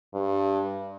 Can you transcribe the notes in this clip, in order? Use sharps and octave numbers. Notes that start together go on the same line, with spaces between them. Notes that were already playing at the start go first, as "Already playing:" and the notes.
G2